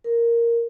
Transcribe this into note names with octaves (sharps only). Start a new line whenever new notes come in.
A#4